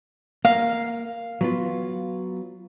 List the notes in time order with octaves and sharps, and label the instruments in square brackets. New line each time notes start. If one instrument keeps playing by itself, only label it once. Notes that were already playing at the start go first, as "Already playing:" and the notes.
[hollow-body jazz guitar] A#3 [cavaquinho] F5
[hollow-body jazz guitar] F#3 B3 F4